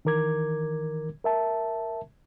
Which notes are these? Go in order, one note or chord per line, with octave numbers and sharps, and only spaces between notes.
D#3 E3 A#4 D6 G#6
A#4 E5 A5